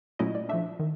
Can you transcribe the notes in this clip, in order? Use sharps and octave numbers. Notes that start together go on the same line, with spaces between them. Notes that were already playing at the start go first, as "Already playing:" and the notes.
A#2 F#3 A3 C#4 E4 D#5
D5
F3 A3 D4 E5
D#3